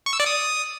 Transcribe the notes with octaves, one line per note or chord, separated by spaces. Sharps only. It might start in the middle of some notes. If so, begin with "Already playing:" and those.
C#6
E6
D5
D#6